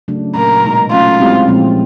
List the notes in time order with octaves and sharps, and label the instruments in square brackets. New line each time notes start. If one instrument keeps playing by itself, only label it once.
[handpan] C#3 F#3 A3 D4
[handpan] A#2 F#3 A#3 [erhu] A#4
[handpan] B2 G#3 B3 D#4
[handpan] F#3 A3 C#4 [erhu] F4
[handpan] G#3 C4 E4 G4
A#2 F3 G#3 C4